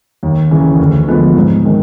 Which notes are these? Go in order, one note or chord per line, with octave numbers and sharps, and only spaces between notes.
D#2
C#3 E3
D2
D3 F3 G#3 B3
G#2
D#3 G#3 C4